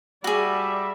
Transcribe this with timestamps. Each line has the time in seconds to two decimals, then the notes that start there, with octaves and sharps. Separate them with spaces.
0.24 G3 F#4 G#4 D5 E5